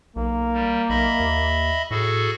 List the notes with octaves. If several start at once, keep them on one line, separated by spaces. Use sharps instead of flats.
B1 A#3
G3
B1 D#5 E5 B5
D#2
A2 F#4 G#4 A4